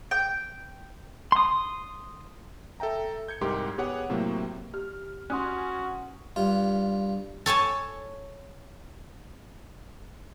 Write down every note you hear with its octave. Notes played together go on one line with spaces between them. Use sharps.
G5
C6 D#6
A4 E5 G5 A#5
G6 G#6 C#7
C2 G#2 G#3 G4 A#4 C6
B3 G4 G#4 C#5 F#5
A2 C3 F#3 A#3
G4 F6
C#4 F#4 C6 D#6 F#6
G2 F4
A4 C#5 G#5 A5